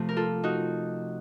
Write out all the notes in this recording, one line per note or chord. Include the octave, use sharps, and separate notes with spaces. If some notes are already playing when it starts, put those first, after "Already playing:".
Already playing: C3 F3 A3
A#4
F4 A4
D#4 F#4